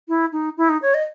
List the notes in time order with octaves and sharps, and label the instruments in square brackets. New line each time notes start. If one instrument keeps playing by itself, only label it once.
[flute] E4
D#4
E4
D#4
C#5
D#5